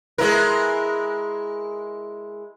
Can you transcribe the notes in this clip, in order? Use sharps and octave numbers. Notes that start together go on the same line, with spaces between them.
G#3 E4 A#4